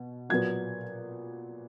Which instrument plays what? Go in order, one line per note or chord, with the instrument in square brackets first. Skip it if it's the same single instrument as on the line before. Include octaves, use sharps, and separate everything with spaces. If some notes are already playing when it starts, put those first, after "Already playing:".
Already playing: [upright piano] B2
A#2 F#3 B3 G#6